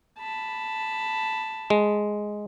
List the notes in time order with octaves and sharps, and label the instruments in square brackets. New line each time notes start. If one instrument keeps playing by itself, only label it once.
[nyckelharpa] A5 B5
[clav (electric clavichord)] G#3